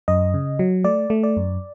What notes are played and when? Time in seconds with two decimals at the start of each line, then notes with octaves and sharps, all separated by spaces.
0.08 F#2 D#5
0.34 C#3
0.59 F#3
0.84 A3 D5
1.10 A3
1.23 D5
1.37 F#2